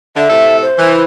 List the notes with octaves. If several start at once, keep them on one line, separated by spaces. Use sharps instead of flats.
D3 E5
A2 C3 A4
C5
E3